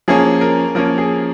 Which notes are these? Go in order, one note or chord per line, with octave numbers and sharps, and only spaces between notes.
F3 A#3 C#4 G#4
A#4
F3 A#3 C#4 A#4
G#4